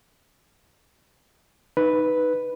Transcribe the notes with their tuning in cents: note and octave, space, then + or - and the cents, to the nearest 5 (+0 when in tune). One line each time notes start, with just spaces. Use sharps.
D#4 +0 B4 +0